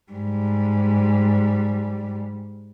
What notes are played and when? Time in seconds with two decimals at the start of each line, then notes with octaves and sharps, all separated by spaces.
0.12 G#2 G3